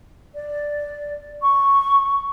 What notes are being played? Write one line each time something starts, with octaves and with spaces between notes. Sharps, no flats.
D5
C#6